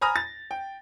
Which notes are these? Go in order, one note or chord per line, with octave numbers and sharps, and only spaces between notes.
G#5 A#5 B5 D#6 F6 A#6
A6
G5